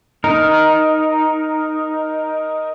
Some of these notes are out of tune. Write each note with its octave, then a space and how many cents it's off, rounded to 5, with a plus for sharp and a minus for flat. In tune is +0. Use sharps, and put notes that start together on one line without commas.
D#4 +0 A#4 +10